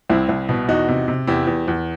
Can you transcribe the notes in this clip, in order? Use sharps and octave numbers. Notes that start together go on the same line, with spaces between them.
C2 C4 E4
C2
B2
E2 D#4 F#4
C3
C3
E2 E4 G4
E2
E2